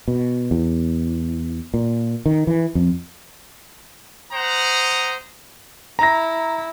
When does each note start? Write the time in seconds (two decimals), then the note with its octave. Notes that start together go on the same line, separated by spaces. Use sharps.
0.08 B2
0.51 E2
1.74 A#2
2.26 D#3
2.47 E3
2.75 F2
4.32 C5 F#5 A#5 D#6
5.99 E4 A#5 A#6